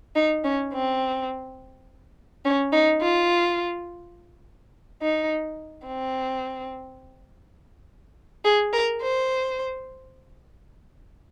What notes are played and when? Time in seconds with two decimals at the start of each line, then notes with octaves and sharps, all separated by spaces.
0.15 D#4
0.44 C#4
0.73 C4
2.45 C#4
2.72 D#4
3.01 F4
5.02 D#4
5.87 C4
8.45 G#4
8.73 A#4
9.02 C5